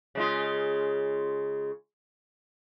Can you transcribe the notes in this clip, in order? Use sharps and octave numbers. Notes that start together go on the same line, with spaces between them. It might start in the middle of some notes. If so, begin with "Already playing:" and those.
C#3 G#3 F4